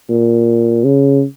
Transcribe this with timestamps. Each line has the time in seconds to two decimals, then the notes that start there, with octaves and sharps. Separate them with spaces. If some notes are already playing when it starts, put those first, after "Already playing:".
0.09 A#2
0.84 C#3